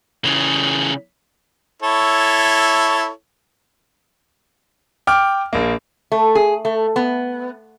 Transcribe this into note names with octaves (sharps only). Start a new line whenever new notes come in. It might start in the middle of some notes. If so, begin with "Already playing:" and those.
C#3 E3
E4 A4 C#5
G5 D6 F6
A#1 A#3
A3
G#4
A3
B3